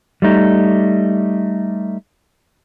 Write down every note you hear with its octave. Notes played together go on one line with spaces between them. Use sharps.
G3 A3 D#4